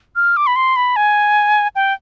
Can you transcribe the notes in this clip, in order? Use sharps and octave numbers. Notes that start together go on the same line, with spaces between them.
F6
D6
B5
C6
B5
G#5
G5